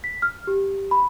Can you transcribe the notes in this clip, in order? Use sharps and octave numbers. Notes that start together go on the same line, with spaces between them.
B6
F6
G4
B5